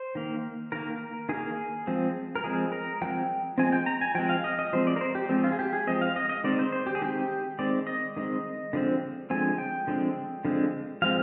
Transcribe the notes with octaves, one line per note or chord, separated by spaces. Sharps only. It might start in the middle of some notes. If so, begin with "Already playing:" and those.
Already playing: C5
D#3 A#3
D#3 A#3 A#4
D#3 A#3 G#4
F3 G#3 C4
A#4
F3 G#3 C4 G#4
A#4
F3 G#3 C4 G5
F3 G#3 C4 G#5
G5
A#5
G#5
F3 G#3 C4 G5
F5
D#5
D#5
F3 G#3 C4 C5
D5
A#4
C5
G4
F3 G#3 C4
F4
G#4
G4
G#4
F3 G#3 C4 D#5
F5
D#5
D#5
D#3 G#3 C4 D5
C5
C5
G4
G#4
D#3 G#3 C4 G4
D#3 G#3 C4 D5
D#5
D#3 G#3 C4
D3 F3 G#3 C4
D3 F3 G#3 C4 G#5
G5
D3 F3 G#3 C4
D3 F3 G#3 C4
F3 G#3 C4 F5